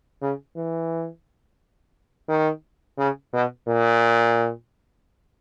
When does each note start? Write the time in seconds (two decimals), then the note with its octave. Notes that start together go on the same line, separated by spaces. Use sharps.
0.22 C#3
0.56 E3
2.29 D#3
2.98 C#3
3.33 B2
3.67 A#2